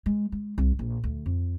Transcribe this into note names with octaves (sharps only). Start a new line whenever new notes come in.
G#3
G#3
C2
A#1
D2
F2